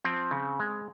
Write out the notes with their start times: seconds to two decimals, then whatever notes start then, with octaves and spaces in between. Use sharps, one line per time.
0.04 F3 C4
0.31 C#3
0.60 G#3